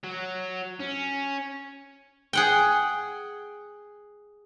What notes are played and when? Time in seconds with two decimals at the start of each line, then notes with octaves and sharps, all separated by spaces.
0.04 F#3
0.80 C#4
2.33 G#4 F#5 G5